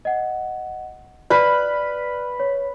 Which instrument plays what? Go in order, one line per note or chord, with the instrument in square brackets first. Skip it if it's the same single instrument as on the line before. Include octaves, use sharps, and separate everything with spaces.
[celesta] D#5 F#5
[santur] B4 B5 [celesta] D5 F6 F#6
[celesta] C#5